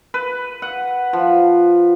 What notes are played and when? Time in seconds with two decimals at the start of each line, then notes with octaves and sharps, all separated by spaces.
0.14 B4
0.62 F#5
1.13 F3